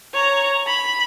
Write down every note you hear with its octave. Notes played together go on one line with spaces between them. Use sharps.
C#5 A#5
B5